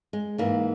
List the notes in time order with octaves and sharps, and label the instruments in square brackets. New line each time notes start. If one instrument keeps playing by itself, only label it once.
[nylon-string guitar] G#3
G#2 E3 A#3